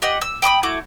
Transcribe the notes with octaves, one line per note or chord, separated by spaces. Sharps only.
G4 D#5 F#5
E6
G5 B5 D6 D#6
A3 E4 F#4 D6